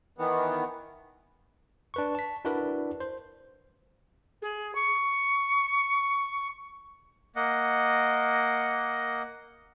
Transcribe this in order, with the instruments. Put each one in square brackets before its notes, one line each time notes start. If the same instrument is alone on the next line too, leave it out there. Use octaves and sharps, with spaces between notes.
[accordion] D#3 E3 B3
[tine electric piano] D4 B4 C#6
A5 B6
D4 E4 F#4 A#4 B4 D5
C5
[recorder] G#4
C#6
[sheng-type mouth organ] A#3 D#5 F#5